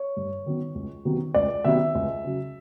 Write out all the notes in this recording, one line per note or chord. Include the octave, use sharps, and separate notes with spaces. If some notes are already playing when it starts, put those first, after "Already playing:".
Already playing: C#5
G2
D#3 F#3 B3
C#2
C3 D#3 F#3 B3
C#2 D5
C3 D#3 F#3 B3 E5
C#2
C#3 F#3